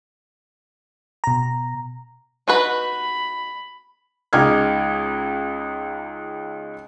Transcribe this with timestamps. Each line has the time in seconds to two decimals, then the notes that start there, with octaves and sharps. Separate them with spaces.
1.24 B2 A#5
2.48 D#4 F#4 B4 B5
4.33 C#2 G#3 D#4 D6 F6 G#6